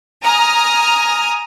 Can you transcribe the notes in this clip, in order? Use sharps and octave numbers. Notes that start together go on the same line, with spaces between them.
G#5 A#5 D#6 F6